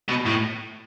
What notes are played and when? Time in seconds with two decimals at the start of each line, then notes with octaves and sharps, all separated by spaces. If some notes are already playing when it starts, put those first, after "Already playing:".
0.09 B2
0.26 A2